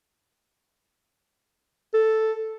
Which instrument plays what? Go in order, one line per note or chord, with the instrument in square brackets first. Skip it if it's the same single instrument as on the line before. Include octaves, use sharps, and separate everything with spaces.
[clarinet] A4